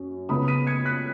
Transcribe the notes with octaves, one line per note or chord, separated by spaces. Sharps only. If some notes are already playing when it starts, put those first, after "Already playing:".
Already playing: F#2 C#4
C#2 C#3 B3 B5 D#6
B6 D#7
G#6 C#7
F#6 B6